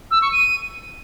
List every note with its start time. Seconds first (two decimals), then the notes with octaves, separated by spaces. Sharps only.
0.10 E6
0.21 C#6
0.32 D#7